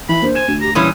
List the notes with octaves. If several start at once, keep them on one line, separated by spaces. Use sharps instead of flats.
E3 B5
A#3 D4 C5
G#5 E7
D2
G4 A#5
A#2 E3 G3 C#4 D#6